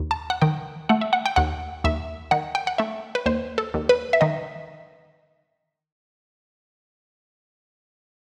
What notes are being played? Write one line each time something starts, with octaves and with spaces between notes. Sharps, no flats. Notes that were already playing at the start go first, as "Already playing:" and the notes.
Already playing: D#2
A5
F#5
D#3 G5
A3 F#5
E5
F#5
G5
D#2 F#5
D#2 E5
D#3 F#5
G5
F#5
A3 E5
B4
D#2 C5
A4
D#2
B4
E5
D#3 D#5